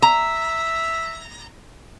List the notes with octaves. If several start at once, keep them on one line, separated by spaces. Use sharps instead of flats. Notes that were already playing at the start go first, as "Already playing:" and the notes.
E5 A#5